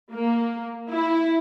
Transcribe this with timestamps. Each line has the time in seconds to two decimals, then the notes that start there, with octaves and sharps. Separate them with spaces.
0.13 A#3
0.92 E4